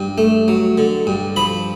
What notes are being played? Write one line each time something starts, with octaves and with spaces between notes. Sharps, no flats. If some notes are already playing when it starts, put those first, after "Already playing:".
Already playing: G2
A3
F#3
D3
G2
F3 B5